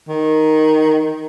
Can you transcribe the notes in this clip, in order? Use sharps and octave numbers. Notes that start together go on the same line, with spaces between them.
D#3